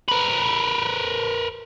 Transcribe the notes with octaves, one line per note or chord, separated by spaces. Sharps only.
A#4 B4